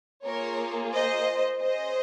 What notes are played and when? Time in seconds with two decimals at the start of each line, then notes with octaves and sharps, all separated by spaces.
0.24 A#3 F4 G#4 A#4 C#5
0.93 C5 D#5
1.61 C#4 G#4 C5 D#5